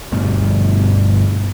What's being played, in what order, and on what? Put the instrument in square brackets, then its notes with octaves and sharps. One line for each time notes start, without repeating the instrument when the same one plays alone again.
[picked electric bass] G1 G2 B2 A3